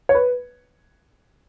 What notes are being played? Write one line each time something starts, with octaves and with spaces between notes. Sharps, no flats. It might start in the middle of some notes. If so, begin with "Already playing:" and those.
C#5
B4